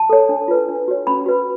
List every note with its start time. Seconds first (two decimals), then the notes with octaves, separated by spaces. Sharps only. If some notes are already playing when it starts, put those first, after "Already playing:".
Already playing: A5
0.09 A4 C#5
0.29 D4
0.48 F4 B4
0.69 D4
0.88 F#4 C#5
1.07 C#4 B5
1.26 F#4 B4